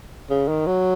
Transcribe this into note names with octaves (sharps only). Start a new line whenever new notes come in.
C#3
D#3
F#3